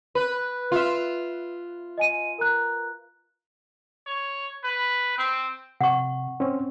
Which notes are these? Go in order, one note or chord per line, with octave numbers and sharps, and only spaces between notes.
B4
F4 E5
D#5 G#5 D#7
A#4 A#5 F#6
C#5
B4
C4
C3 F#5 C#6
C4 C#4